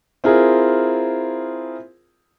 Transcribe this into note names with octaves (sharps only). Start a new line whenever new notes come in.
C4 E4 F4 G#4 A#4